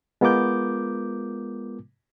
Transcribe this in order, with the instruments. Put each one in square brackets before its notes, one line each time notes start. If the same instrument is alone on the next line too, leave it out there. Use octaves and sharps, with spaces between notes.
[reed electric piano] G#3 B3 F4 A#4 D6 G6